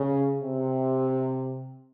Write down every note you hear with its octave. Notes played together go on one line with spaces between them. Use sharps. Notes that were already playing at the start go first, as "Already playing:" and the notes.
Already playing: C#3
C3